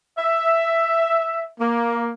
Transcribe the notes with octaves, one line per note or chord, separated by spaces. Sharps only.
E5
A#3